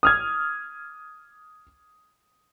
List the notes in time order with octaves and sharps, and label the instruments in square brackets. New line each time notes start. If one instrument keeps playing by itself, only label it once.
[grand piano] D#6 F6 G#6